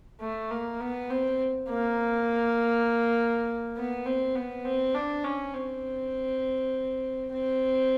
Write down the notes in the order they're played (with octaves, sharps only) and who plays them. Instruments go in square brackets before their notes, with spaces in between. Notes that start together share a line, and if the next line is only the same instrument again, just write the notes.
[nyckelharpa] A3
A#3
B3
C4
A#3
B3
C4
B3
C4
D4
C#4
C4
C4